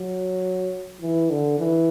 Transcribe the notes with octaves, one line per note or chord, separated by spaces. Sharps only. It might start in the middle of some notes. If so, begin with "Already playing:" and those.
Already playing: F#3
E3
D3
E3